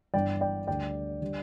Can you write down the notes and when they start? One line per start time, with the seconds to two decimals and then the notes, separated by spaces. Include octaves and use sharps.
0.14 G1 G2 E3 D5 G5
0.41 D5 G5
0.67 D2 D3 G3 D5 G5
1.21 D3 G3